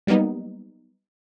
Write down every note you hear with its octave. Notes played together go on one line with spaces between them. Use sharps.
F#3 G3 A#3 B3 D#4